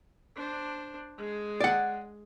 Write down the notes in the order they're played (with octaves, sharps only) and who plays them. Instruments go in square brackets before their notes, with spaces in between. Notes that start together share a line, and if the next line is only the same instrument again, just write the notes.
[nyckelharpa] D4 C5
G#3 G#4
[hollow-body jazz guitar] D5 F#5